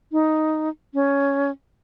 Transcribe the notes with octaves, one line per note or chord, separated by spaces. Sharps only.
D#4
C#4